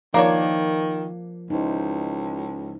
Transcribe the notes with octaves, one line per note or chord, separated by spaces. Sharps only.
D#3 F3 A#3 D4 C#5
C#2 D#4 E4 C5